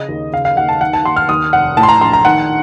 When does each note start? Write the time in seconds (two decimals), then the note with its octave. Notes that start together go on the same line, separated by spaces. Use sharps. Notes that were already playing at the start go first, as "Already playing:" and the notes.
Already playing: C#3 D#5
0.09 D#2
0.32 C#3 F5
0.45 F5
0.57 D#2 F#5
0.69 A5
0.81 D#3 F#5
0.93 A5
1.05 D#2 C6
1.16 F6
1.29 D#2 D#6
1.53 F1 F#5
1.77 A2 A5
1.83 C6
1.89 A#5
2.01 A#1 C6
2.13 A#5
2.25 D#3 F#5